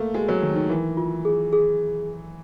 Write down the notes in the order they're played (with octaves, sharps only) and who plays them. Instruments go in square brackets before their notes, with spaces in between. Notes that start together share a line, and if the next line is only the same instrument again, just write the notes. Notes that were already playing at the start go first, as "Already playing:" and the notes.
Already playing: [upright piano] A3 A#3 [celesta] F5
[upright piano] G#3 [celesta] F#4
[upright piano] F#3
[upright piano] D#3 [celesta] D#4
[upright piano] D#3
[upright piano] E3 [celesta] A#4
[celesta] F4
G#4
G#4